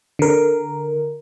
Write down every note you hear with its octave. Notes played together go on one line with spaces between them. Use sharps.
D3 A#4